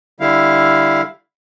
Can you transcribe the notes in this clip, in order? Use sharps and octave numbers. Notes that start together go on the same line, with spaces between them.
D3 G3 E4 F5